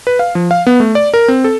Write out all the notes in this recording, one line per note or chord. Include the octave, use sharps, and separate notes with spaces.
B4
F5
F3
F5
B3
A3
D5
A#4
C4
A4